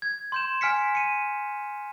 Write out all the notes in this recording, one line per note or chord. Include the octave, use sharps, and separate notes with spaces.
G#6
C6 G6 E7
G#5 F6 B6 C#7
C#7 D#7